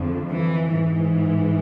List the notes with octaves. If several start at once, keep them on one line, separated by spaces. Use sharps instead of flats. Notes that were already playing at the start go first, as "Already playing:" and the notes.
Already playing: F2 D3
E3
G#2 E3